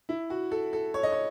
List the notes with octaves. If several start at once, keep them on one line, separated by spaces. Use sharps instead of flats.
E4
F#4
A4
A4
C#5
D#5
C#5